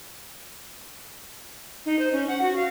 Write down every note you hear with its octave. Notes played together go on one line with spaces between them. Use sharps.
D#4
C5
C#4
F#5
F#4
F5